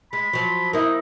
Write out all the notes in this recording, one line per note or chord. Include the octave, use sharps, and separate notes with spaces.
G#3 B5
F3 F#3
A#3 D#4 E4